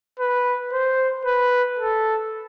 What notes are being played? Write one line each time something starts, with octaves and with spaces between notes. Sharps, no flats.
B4
C5
B4
A4